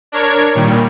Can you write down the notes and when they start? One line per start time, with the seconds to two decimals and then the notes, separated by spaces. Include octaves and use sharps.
0.12 D4 A#4 C#5 G#6
0.55 A#2 D#3 G3